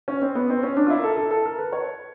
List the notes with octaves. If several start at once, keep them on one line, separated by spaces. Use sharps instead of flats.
C#4
C4
B3
C4
C#4
D4
F4
E4
A#4
A4
A4
A4
A#4
B4
C#5